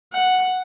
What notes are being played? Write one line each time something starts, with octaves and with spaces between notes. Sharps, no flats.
F#5